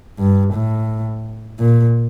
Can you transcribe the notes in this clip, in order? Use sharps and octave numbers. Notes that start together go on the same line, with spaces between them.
G2
A2
A#2